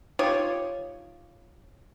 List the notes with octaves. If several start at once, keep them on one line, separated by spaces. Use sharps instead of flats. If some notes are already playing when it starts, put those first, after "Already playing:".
D#4 F4 G4 C#5